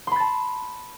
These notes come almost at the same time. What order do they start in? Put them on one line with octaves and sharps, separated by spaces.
C6 B5 A6 A5